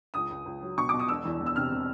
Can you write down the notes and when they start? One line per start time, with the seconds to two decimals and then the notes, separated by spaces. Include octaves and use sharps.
0.14 C#2 D#6
0.30 C#2
0.45 C#2
0.62 F#3
0.78 B2 C#6
0.89 B2 D6
0.99 D#6
1.08 E1 E6
1.25 E2
1.41 E2
1.46 E6
1.56 C3 F6
1.72 C3